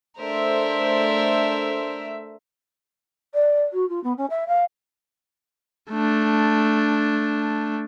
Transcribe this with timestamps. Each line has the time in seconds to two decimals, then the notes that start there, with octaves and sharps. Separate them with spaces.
0.17 A3 D4 A#4 C5 E5
3.34 D5
3.73 F#4
3.89 F4
4.03 B3
4.17 C#4
4.30 E5
4.48 F5
5.91 A3 D4